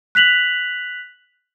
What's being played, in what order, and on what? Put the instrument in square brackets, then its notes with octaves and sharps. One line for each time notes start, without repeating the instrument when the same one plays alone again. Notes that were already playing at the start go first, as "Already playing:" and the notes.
[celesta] F#6 B6 F7 F#7